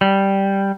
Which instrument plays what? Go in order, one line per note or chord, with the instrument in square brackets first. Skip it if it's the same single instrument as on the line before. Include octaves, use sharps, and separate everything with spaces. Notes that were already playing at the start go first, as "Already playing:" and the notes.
[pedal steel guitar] G3